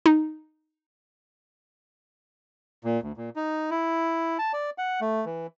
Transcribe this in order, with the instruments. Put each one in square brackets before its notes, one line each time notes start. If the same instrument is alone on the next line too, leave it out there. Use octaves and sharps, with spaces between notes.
[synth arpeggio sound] D#4
[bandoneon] A#2
D2
A#2
D#4
E4
A5
D5
F#5
A3
E3